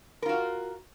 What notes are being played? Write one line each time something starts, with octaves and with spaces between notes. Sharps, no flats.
F4 F#4 A#4